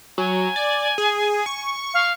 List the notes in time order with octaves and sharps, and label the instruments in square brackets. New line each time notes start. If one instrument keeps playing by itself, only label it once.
[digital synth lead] F#3 [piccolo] G#5
[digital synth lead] D5
G#4
C#6
[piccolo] F5